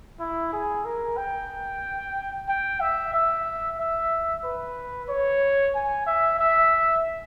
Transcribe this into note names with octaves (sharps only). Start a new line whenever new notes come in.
E4
G#4
A#4
G5
G5
E5
E5
E5
B4
C#5
G#5
E5
E5